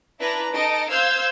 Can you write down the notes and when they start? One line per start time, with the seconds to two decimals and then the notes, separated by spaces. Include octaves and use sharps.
0.19 D4 E4 B4 A#5
0.51 D#4 A4 D#5 D7
0.91 C5 F5 E6 G6 G#6